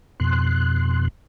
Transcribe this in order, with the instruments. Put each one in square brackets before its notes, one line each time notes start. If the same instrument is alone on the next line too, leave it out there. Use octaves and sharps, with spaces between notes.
[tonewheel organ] F2 B2 C6 F#6